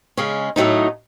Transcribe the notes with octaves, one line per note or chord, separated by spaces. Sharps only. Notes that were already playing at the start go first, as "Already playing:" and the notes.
C#3 G#3 C#4
A2 F#3 A3 D#4